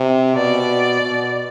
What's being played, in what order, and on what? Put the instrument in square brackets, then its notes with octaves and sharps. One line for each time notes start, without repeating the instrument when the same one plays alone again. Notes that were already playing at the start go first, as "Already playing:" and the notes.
Already playing: [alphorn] C3
[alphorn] B2 [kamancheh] D5
[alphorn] B2